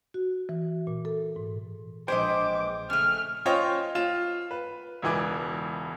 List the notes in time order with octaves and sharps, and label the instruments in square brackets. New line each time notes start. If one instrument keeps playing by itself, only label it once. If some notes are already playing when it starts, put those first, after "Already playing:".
[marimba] F#4
E3
A#2
A4
G#2
[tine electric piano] A#1 G5 [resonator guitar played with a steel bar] G#3 B4 D#5 [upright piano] C5 [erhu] D6
[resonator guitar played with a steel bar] C#3 A3 [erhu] F6
[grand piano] C#4 F4 C5 C#5 D#5 G5
F4 E7
B4
E1 C#2 E3 D6